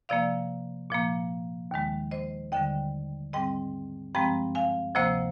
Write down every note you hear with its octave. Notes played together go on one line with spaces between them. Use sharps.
C3 F3 A#3 D5 F5
A#2 F3 A#3
D#2 D#3 G#3
C5 D#5
D#2 D3 G3 D#5 G5
G#2 G3 C4 D#5 G5
G2 F3 G#3 C4 G5 A#5
F5 G#5
D2 C3 F3 A#3 C5 D#5